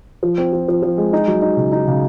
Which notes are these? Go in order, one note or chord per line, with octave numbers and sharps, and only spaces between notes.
F3
C4
F3
F3
F3
G#3
D#4
F#3
D#4
C#3
D#4
C#3